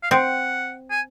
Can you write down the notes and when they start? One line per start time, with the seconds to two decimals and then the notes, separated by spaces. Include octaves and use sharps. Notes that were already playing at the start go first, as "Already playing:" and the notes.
0.03 F5
0.11 C4 F#5
0.91 G#5